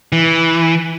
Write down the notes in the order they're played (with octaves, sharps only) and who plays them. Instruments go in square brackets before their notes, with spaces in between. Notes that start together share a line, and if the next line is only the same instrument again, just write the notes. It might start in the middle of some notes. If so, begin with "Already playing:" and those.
[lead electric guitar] E3